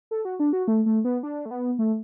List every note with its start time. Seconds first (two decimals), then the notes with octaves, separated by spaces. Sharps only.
0.11 A4
0.25 F#4
0.40 D4
0.53 F#4
0.68 A3
0.86 A3
1.05 B3
1.23 D4
1.46 A3
1.51 B3
1.79 A3